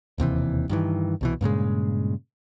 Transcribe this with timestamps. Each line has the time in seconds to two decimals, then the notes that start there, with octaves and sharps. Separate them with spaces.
0.18 E1 D#2 C3 E3
0.69 G2 D#3 E3
1.21 C2 B2 E3
1.41 G2 A#2 C#3 G#3